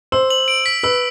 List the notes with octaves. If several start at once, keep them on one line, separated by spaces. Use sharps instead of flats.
C5 E6
F#7
D7
B6
B4 E6